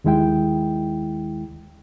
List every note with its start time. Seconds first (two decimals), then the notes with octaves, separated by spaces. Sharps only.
0.04 D#2 D#3 G#3 E4 G5